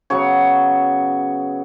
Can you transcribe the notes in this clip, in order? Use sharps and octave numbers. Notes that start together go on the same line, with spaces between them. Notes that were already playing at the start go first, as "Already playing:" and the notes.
C#3 F#3 B3 C#5